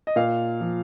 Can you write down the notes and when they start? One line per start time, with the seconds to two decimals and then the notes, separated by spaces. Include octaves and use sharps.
0.07 D#5
0.16 A#2 F5
0.61 F3